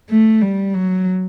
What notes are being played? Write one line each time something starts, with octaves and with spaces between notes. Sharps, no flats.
A3
G3
F#3